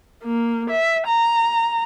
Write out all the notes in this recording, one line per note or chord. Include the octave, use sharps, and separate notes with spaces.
A#3
E5
A#5